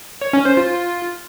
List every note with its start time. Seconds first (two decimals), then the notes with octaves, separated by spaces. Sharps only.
0.21 C#5
0.33 C#4
0.45 C5
0.57 F4